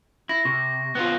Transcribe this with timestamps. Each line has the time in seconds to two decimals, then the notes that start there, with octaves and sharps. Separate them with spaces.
0.29 E4 A#6
0.45 C3 C#6
0.95 B3 C4 F4 F#6